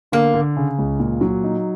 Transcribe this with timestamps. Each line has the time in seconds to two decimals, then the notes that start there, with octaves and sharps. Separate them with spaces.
0.12 D3 A#3
0.34 D3
0.57 C#3
0.79 C#2
1.00 A#2
1.21 F#3
1.44 D#4